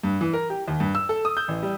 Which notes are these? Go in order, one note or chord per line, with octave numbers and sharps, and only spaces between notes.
G2
E3
A#4
G4
D#2
G2
E6
A4
D#6
G6
A1
G3